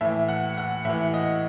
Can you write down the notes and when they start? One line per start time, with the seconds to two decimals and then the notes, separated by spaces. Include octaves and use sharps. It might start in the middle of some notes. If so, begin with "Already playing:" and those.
0.01 A2 E3 E5
0.28 F#5
0.58 F#5
0.85 A2 E3 E5
1.14 D#5